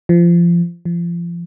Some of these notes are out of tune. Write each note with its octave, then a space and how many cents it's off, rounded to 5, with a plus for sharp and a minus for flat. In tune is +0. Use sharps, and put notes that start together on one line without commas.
F3 -25
F3 -30